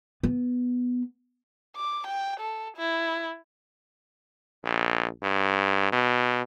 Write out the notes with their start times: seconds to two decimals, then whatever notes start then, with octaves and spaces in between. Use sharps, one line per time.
0.23 B3
1.76 D6
2.07 G5
2.40 A4
2.77 E4
4.64 A#1
5.23 G2
5.92 B2